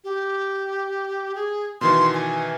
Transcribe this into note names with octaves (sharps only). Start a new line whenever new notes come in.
G4
G#4
B2 D#3 E3 C6
G#5